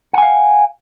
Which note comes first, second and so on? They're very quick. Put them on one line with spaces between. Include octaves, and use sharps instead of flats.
F#5 G#5 F5